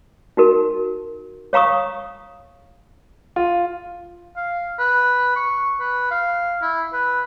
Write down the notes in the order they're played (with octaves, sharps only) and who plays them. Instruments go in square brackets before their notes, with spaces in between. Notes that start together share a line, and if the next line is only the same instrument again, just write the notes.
[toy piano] D#4 F#4 A#4
C#5 F5 A#5 C#6 D#6
[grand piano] F4
[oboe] F5
B4
C#6
B4
F5
E4
B4